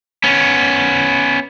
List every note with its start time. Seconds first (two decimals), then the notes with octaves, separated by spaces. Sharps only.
0.24 B3 C#4